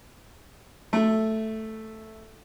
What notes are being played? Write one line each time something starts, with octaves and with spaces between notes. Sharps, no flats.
A3